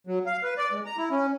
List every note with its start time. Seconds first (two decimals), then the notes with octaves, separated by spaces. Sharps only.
0.07 F#3
0.26 F5
0.43 B4
0.57 D5
0.72 G#3
0.85 A#5
0.97 E4
1.11 C#4